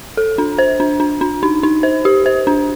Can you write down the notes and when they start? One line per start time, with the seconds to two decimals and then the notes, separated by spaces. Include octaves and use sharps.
0.17 A4
0.38 D4
0.59 C5
0.80 D4
1.00 D4
1.21 D4
1.43 D#4
1.63 D#4
1.83 C5
2.05 G4
2.26 C5
2.47 D4